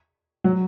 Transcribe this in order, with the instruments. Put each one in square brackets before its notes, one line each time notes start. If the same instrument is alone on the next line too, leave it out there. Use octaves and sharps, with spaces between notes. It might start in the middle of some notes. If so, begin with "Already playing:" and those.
[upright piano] F#3